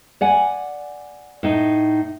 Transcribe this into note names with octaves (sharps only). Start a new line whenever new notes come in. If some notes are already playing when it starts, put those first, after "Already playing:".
D5 F#5 G#5
A2 D#4